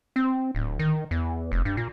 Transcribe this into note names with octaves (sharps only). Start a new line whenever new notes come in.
C4
D1
D#3
E2
F1
G2
A#2